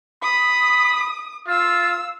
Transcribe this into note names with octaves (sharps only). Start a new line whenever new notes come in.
B5 D#6
F4 F5 E6